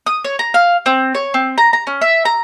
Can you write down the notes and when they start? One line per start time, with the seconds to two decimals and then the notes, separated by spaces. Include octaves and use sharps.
0.06 D#6
0.25 C#5
0.39 A#5
0.54 F5
0.86 C4
1.15 C#5
1.34 C4
1.58 A#5
1.73 A#5
1.87 C#4
2.01 E5
2.25 A#5